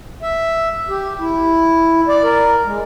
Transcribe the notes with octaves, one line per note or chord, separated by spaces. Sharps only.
E5
G4
E4
D5
A#4
G#3